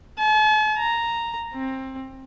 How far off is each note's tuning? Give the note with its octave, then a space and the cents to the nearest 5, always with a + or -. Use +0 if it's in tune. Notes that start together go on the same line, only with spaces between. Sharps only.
A5 -45
A#5 -5
C4 +20